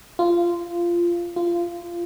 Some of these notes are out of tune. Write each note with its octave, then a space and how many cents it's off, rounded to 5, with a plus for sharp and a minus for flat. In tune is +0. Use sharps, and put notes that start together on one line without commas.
F4 -15
F4 -20